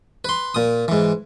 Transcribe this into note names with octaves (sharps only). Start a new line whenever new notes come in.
B4 C6
A#2 D#6
G#2 E3